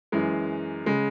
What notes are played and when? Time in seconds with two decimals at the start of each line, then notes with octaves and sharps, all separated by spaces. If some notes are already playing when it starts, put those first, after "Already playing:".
0.12 F#2 E3 G#3
0.86 C#3 G#3